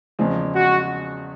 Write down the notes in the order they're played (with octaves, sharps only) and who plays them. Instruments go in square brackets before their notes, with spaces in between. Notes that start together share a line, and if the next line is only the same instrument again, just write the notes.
[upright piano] E2 C#3 F3 G#3 C4
[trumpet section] F#4